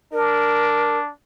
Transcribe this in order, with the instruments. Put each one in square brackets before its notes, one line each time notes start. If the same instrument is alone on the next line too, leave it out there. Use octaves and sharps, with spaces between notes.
[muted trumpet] D4 [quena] A#4